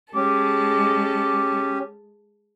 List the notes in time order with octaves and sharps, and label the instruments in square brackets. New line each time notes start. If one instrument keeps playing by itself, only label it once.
[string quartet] G#3 A4 [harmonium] C#4 G4 [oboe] D6